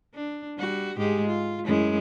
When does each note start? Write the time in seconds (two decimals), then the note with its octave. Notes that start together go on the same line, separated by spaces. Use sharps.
0.15 D4
0.58 G3 F#4
0.97 G#2 G#3 G4
1.28 F4
1.65 F#2 G#3 E4